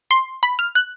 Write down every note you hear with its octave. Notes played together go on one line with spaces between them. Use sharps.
C6
B5
F6
F#6